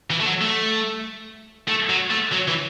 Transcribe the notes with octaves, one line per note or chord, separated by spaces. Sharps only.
E3
A3
F#3
A3
A3
F#3
A3
F#3
E3